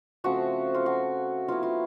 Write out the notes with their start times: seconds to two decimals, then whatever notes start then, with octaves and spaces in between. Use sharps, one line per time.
0.24 C#3 F3 A3 C4 F#4
0.74 F4
0.86 F#4
1.48 F#3 B3 E4 F4
1.63 F4